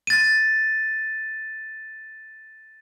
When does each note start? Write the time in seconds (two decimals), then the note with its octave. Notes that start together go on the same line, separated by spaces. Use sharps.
0.07 A6 D#7